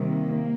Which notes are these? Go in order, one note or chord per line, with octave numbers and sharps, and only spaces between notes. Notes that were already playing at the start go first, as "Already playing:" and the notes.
Already playing: C3 D#3 G3 A#3